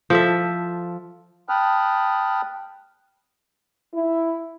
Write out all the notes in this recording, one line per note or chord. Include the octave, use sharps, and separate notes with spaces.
F3 A4 E5
G5 A5 B5 D#6 F6 F#6
E4